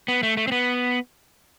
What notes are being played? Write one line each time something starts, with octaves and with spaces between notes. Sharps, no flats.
B3
A3
A3
C4
B3